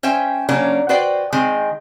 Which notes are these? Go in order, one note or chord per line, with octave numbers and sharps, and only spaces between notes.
C#4 C5 E5 G5
C#3 F#3 A#3 C#4 D4
F#4 B4 C5 D5 G5
D#3 G#3 C4